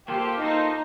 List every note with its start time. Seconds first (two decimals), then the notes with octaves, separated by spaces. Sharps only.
0.08 A#3 F4 G4 A4 C5
0.41 A#3 D#4 F4 A4 C5